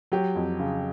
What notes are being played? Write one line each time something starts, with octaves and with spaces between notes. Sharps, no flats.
F#3 G4
F2
C#3